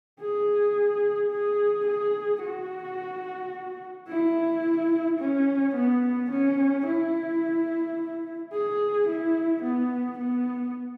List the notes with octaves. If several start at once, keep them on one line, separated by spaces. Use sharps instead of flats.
G#4
G#4
G#4
F#4
E4
C#4
B3
C#4
E4
G#4
E4
B3
B3